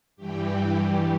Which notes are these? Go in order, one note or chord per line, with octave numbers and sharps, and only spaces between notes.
G2 E3 G3 G4